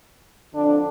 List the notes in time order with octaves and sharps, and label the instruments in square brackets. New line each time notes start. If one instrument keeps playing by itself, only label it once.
[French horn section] F2 D3 D4